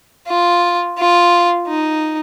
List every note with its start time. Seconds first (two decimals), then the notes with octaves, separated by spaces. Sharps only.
0.28 F4
0.98 F4
1.68 D#4